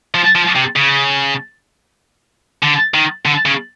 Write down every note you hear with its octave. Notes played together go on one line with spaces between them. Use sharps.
F3
F3
C3
C#3
D3
D#3
D3
C#3